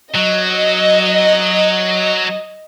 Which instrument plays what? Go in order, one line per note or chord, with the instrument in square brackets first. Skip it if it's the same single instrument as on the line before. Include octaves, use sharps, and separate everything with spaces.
[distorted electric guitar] F#3 [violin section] D#5